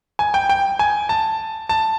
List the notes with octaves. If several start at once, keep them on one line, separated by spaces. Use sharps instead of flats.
G#5
G5
G5
G#5
A5
A5